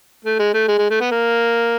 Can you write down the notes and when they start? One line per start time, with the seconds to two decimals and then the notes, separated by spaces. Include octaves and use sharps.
0.25 A3
0.39 G#3
0.54 A3
0.68 G#3
0.78 G#3
0.90 A3
1.00 B3
1.11 A#3